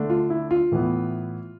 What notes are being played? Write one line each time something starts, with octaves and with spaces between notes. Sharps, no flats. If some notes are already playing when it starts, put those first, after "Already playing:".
Already playing: D3 A3 D4
F4
E4
F4
A2 E3 B3